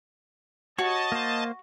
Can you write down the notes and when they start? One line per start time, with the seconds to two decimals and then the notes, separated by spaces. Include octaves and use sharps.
0.79 F#4 C#5 D#5 A5
1.12 A#3 C5